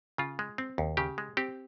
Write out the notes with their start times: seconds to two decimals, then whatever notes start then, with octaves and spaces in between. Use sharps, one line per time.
0.18 C#3 F4
0.39 G#3
0.58 C4
0.78 D#2
0.97 C#3 G4
1.18 G#3
1.37 C4 G4